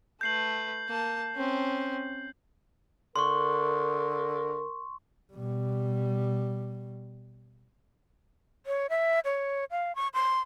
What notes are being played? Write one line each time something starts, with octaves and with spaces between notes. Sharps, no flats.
A3 B4 G6 C7 F#7
A#3 A5
C4 C#4
D3 A#4 C6 C#6
B2 G3
C#5
E5
C#5
F5
C#6
C6